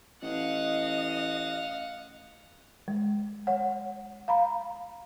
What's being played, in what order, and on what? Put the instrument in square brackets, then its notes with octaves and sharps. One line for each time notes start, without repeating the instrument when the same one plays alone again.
[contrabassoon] A1 [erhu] D#5 [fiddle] F5 F#5
[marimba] G#3
C#5 F#5
F5 A#5 B5